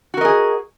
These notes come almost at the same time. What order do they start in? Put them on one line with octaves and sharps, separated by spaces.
F#4 A#4 D#5 G#4